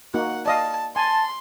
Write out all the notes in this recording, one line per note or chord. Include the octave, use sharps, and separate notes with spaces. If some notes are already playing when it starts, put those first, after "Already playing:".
A#3 D#4 F#4 F#5
D5 D#5 F5 A5
G#5 A5 C6